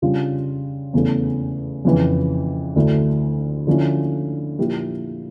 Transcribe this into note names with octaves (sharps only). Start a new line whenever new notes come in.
C#3 G3 D4 F4
E2 C#3 E3 A3
F2 C#3 E3
D2 D3 A3 E4
D3 F3 C#4 E4
A#2 F3 A#3 E4 G4